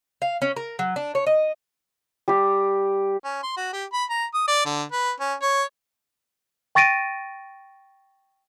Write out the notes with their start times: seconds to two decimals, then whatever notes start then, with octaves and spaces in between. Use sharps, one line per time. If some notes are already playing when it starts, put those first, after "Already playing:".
0.22 F5
0.42 C#4
0.56 A#4
0.79 F#3
0.96 D4
1.15 C#5
1.27 D#5
2.28 G3 G4
3.24 C#4
3.43 C6
3.57 F#4
3.73 G4
3.93 B5
4.10 A#5
4.34 D#6
4.48 D5
4.66 D3
4.92 B4
5.20 C#4
5.42 C#5
6.75 G5 C#6 A6 A#6 D7 D#7